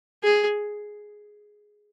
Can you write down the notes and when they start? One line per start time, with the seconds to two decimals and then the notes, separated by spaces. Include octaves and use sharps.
0.24 G#4